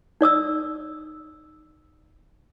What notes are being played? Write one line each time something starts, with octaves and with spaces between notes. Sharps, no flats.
D#4 D5 D#6 E6